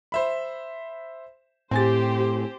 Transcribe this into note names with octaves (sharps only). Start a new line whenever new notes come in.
C5 E5 B5
A2 C4 G4 C5 G#5 A6